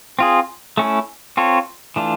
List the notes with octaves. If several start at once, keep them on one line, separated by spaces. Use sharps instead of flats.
C4 F4 G#4
A3 C#4 E4
C4 F4 A4 C#5
E3 A3 D4 F4